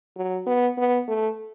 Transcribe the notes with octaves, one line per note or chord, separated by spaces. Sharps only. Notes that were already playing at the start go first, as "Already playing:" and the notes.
F#3
B3
B3
A3